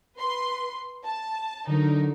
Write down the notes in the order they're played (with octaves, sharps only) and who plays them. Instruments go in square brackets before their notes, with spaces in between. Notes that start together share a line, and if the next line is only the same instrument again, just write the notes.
[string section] B4 C6
A5
[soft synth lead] D3 [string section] F#3 D#4 A#4